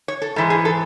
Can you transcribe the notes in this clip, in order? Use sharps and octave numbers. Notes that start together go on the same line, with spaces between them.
C#5
A4
G#2 E3 G#3 A4
G#4
A4